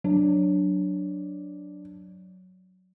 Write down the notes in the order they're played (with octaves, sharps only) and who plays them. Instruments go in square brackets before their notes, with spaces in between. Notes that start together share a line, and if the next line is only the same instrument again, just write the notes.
[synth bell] F#3 [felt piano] D4